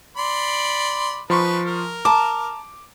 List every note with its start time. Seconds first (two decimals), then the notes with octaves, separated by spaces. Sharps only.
0.17 D5 B5 C6
1.30 F3 D#4 B4 C6 C#6
1.66 A#4
2.05 A5 A#5 D6